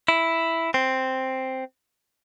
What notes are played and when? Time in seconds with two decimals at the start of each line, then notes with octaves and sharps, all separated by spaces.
0.08 E4
0.74 C4